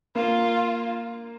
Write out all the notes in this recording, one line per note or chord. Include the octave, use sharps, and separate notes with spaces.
A#3 F4